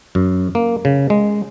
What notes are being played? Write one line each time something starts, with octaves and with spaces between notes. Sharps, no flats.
F#2
A#3
C#3
G#3